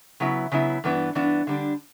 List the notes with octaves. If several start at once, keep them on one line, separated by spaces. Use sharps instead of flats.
C#3 F#3 B3 E4
C#3 F#3 B3 E4
G2 E3 B3 D4
G2 E3 B3 D4
D3 G3 D4